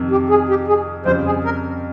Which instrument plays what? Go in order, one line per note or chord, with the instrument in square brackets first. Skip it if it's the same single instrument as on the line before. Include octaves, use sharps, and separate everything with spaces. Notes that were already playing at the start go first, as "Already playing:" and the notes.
Already playing: [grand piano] F2 C3 D#3
[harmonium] G4
G#4
G4
G#4
[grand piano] F2 C#3 G3 [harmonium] C5
[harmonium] G#4
A#4